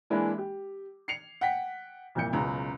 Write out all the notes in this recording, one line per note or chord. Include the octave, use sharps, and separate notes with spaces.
E3 G#3 A#3 D4 E4
G4
C7 C#7 F7
F#5 G5 B6
C2 F2 A#2 G6 C#7
F#1 C#2 B2 A#5